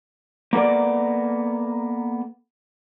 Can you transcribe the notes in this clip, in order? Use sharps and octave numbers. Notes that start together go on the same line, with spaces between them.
A#3 B3 A4 A#4 D5